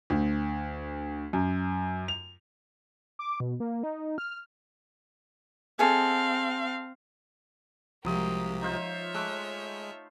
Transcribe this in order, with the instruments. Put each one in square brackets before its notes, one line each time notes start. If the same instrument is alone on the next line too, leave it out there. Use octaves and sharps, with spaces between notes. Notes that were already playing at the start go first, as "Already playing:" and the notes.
[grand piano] D2
F#2
F7
[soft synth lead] D6
B2
A#3
D#4
F6
[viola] C4 F5 [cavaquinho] G#4 A4 D#5
[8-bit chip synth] C2 C3 [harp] F3 [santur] F#3 D#6 [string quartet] G#3 A#3 G4
[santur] D#4 F4 C5 [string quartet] C#5 E5
[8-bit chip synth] G#3 [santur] A3 [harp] D6 E6 F#6